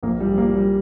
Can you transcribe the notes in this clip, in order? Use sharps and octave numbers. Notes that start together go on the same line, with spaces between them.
A#1 A#3
G3
A#1
A#3
F3
G3